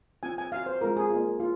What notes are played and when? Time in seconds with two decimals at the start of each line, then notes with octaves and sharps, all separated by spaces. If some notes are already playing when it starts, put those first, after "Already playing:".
0.23 C4 F4 G#5
0.38 G#5
0.52 C4 F#4 F5
0.66 C5
0.81 G#3 C4 F4 A#4
0.97 G#4
1.10 A#3 F4
1.40 F4